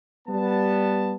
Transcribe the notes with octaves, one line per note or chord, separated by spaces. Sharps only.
G3 B3 A5